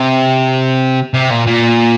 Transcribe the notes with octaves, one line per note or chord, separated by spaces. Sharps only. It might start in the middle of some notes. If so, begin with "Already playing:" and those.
Already playing: C3
C3
A#2
A#2